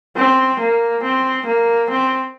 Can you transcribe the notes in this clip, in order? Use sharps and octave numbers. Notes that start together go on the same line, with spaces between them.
C4
A#3
C4
A#3
C4